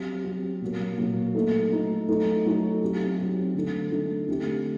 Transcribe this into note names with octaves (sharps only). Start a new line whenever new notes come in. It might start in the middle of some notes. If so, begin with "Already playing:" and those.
Already playing: F#3 C4 G4
F#3 C4 G4
A#2 F#3 A#3
A#2 F#3 A#3
A3 D#4 A4
A3 D#4 A4
F#3 A3 D#4 A4
F#3 A3 D#4 A4
F#3 C4 D#4 G4
F#3 C4 D#4 G4
D3 A3 D#4 A4
D3 A3 D#4 A4
D3 A3 C4 G4